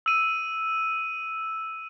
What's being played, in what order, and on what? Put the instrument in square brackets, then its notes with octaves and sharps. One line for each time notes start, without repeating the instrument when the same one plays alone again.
[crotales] E6 D#7